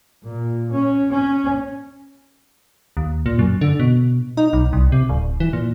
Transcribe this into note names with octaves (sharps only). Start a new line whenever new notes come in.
A#2
C#4
C#4
D#2
A#2
F#2
D3
B2
D#4
B1
C2
C3
D1
E3
A#2